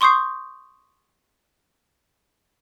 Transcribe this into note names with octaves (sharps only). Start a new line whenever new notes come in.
C6 C#6 D#6 G6 C7